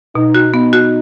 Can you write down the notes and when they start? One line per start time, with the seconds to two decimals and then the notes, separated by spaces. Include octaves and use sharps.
0.15 B2 D#4
0.35 F#4
0.54 B3 D#4
0.73 F#4